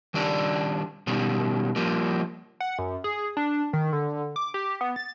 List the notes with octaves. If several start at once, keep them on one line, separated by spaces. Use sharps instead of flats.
D#3 G3 D4 D5
B2 D#3 G3
F3 G3 A#3
F#5
F#2
G#4
D4
D#3
D3
D6
G4
B3
A6